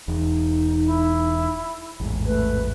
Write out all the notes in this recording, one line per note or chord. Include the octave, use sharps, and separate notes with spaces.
E1 E2 D#4
E4
A1 E2 G#2
A3 B4